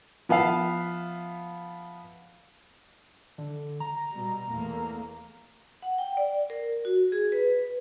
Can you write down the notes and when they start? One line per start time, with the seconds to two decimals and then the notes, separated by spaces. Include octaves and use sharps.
0.29 F3 B3 E5 F5
3.38 D3
3.80 A#5
4.12 B2 G3
4.49 E2 A3 A#3
5.82 F#5
5.98 G5
6.17 D5
6.50 A#4
6.85 F#4
7.12 G#4
7.32 B4